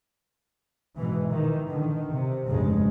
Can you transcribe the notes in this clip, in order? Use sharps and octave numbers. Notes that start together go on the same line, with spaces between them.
G#2 B2 E3
D#3 E3
D3 D#3
C3
F1 A#1 G2 C#3 G#3